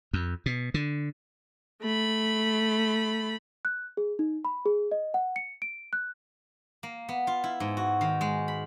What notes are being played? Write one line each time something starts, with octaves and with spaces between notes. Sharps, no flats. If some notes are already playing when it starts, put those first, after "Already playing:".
F2
B2
D3
A3 B5
F#6
G#4
D#4
B5
G#4
D#5
F#5
C#7
D7
F#6
A#3
B3
F4
E4
G#2
F#4
D#3
G#3
B5